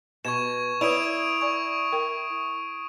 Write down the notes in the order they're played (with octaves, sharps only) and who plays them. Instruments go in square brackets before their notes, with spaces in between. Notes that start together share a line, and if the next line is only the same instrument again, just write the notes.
[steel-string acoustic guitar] B2 [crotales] C#6 G#6 E7
[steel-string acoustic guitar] E4 [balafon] B4 C#5 D5 [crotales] D#6 D7 F7
[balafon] D5 G#5 [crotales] C#6
[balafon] A#4 G5